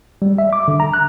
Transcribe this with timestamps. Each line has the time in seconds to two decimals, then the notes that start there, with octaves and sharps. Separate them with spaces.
0.22 G3
0.38 E5
0.53 D6
0.68 D3
0.80 A#5
0.94 F#6